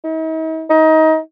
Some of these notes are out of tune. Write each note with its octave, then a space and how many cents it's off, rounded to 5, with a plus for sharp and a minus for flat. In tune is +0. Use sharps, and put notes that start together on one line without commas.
D#4 +45
D#4 +25